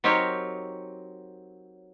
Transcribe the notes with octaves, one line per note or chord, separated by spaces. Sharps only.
F#3 C4 D#4 G4 A#4 C#5